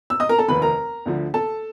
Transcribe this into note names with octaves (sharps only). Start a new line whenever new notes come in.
E6
D#5 D#6
A#4 A#5
A4 A5
F1 D#2 D#3 B4 B5
A#4 A#5
D2 D3 F3
A4 A5